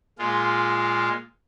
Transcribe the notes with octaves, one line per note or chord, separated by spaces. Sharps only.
A#2 G#3 F4